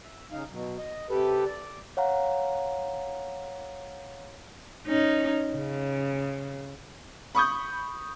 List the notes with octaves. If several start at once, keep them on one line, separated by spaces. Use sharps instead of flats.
E5
C#3 D#4 F5
B2 F#3
D#5
C3 G4 A4 B4
D5
C#5 F5 F#5 A#5
C#4 D#4
C#3
B5 C#6 D#6 G6